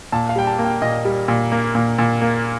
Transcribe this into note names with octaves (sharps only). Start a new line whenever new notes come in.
A#2 A5
F5
G3 G5
A5
A#3
G5
A#2 D#5
G3
A#2
A#3
A#2
A#2
A#3